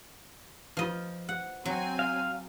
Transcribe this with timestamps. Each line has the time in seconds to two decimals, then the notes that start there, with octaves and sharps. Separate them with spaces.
0.77 F3 F4 B4 D#5
1.29 F#5
1.65 F#3 C4 G#5
1.99 F5